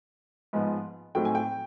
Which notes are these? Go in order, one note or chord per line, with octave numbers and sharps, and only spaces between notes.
G#2 F3 G#3 B3
A2 F#3 A3 C4 D#4 G5
G#5
G5